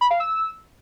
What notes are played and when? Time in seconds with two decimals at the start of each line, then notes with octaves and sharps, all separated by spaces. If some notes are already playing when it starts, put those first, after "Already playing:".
0.01 B5
0.10 F5
0.20 E6